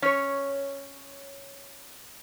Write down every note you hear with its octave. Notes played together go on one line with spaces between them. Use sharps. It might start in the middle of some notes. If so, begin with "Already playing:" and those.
C#4 C#5